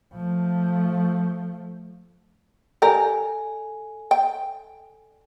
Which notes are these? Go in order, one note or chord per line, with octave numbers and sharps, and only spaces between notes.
F3 A3
G4 A4 A#4 D5 G#5
G5